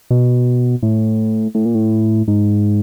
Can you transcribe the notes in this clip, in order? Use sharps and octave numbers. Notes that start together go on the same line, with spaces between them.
B2
A2
A2
A#2
A2
G#2